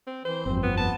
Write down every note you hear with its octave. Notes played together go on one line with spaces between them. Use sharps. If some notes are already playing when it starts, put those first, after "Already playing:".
C4
E3 C5
G1 F2 C4
B3
B3 A5